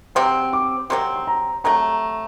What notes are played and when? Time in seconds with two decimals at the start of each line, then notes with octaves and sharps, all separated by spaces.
0.15 C3 F#3 C4 C6
0.53 D6
0.90 C3 F#3 C4 C6
1.16 C6
1.27 A#5
1.64 C3 F#3 A3 A#5